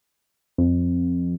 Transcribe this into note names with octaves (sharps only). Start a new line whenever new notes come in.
F2